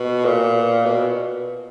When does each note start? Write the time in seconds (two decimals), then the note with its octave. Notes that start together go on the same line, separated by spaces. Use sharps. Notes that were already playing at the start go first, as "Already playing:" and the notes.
Already playing: B2
0.25 A#2
0.86 B2